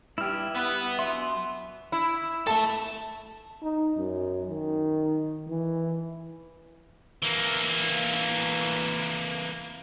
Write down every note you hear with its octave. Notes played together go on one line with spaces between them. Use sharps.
G2 E4 G4 F6
B3
F#3 E5 C6
E4
A4 E5 A5
D#4
F#2
D#3
E3
E3 A#3